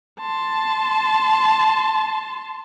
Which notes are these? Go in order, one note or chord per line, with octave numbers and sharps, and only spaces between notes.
A5 C6